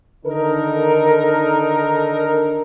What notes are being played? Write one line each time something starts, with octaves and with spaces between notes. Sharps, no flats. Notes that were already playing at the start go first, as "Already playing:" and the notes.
D3 D#3 D#4 A4 A#4